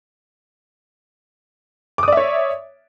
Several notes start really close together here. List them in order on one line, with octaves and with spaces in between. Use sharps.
D6 D#6 D5 E5 C#5